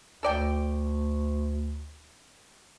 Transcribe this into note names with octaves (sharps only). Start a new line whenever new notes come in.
D2 A4 D5 G5